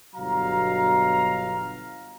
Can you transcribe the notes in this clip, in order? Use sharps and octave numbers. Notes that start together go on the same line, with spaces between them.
G1 B2 F#3 F5 A#5